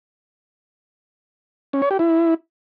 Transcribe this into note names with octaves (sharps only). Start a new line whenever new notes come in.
C#4
C#5
G4
E4